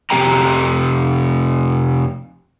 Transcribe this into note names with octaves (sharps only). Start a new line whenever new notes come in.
F2 C3 G3 G4 G5 A#5